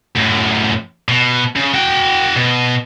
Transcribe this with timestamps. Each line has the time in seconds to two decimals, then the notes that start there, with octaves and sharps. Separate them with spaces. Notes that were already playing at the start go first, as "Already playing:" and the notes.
0.16 F#2 A2
1.08 B2
1.56 C#3
1.74 F#4 G5
2.36 B2